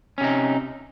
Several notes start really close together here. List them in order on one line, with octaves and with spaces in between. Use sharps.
C#4 C3 D#4